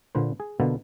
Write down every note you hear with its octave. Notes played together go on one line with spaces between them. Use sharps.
A#2 D3 B4 C5
G#4
B2 D3 A#3 B3 F4 A4